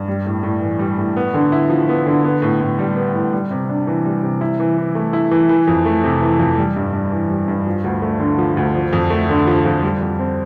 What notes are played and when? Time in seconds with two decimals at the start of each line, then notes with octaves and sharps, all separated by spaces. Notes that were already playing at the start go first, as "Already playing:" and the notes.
Already playing: G2
0.08 G3
0.26 A2
0.43 A2
0.62 E3
0.79 G3
0.98 A2
1.16 B3
1.34 D3
1.52 E4
1.70 F3
1.89 B3
2.06 D3
2.24 B3
2.42 A2
2.61 A2
2.79 G3
2.96 B3
3.14 A2
3.33 G3
3.51 C3
3.69 D4
3.87 E3
4.05 G3
4.23 C3
4.41 E4
4.60 E3
4.77 E3
4.95 A3
5.13 E4
5.31 E3
5.49 E3
5.67 F2
5.86 A3
6.04 C3
6.21 E3
6.39 F2
6.58 G3
6.76 G2
6.93 G2
7.11 E3
7.30 G3
7.48 G2
7.67 F3
7.84 D2
8.02 A3
8.20 D3
8.38 F3
8.57 D2
8.75 F3
8.93 F2
9.10 A3
9.29 D3
9.47 F3
9.65 F2
9.83 G3
10.01 F2
10.19 C4